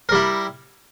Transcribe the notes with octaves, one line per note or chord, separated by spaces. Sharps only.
G3 E4 A#4